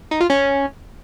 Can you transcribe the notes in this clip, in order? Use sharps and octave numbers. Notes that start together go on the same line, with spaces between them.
D#4
F4
C#4